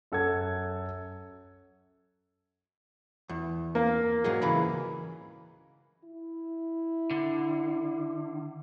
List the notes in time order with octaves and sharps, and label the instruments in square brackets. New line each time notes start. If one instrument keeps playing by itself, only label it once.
[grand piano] F#2 A4 F#5 G#6
[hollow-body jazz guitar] E2
[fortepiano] A#3
[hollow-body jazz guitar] G#2 F#3 G#4
C#2 E3 B5
[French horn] E4
[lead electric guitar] D3